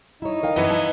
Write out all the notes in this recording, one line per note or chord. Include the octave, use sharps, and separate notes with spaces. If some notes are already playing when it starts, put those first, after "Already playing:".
D#4 E4 C#5
A#4 F5 G5
F#2 E3 B3 E4 D#5
A5